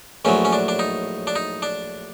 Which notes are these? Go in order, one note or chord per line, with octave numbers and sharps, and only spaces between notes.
A#1 A2 F#3 C#4
C#4
D4
D4
D#4
D4
D#4
D4